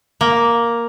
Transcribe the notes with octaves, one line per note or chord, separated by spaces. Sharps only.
A#3